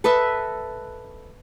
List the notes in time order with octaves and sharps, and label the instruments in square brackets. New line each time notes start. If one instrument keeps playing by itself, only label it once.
[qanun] A4 B4 D#5 E5